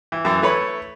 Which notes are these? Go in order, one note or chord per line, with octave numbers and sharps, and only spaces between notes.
E3
F#2 E3
A3 E4 B4 C#5 B5